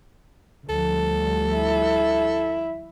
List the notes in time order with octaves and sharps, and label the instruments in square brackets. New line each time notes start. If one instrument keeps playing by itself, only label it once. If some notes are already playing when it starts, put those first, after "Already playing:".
[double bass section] D2 F3 G3 [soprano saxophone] A4
[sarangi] E4